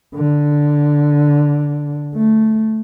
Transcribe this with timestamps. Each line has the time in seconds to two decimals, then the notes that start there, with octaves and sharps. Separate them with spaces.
0.15 D3
2.15 A3